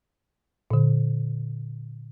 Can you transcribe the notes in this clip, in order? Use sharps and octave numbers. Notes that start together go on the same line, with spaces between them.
A#2 D3